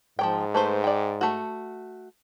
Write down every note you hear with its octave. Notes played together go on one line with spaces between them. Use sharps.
G#2 F3 F#3 G5
A3 B4 C5
D5 G5
A3 F#4